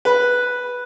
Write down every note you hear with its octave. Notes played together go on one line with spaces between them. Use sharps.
B4